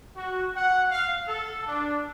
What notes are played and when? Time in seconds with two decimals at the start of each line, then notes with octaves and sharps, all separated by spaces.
0.16 F#4
0.56 F#5
0.90 F5
1.28 A4
1.67 D4